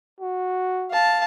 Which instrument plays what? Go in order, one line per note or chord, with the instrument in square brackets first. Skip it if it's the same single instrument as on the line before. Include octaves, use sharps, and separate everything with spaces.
[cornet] F#4
[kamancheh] F5 A5